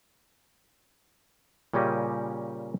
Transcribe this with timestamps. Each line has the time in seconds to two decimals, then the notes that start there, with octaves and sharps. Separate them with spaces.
1.74 A#2 C#3 G3 C#4 G4 D#5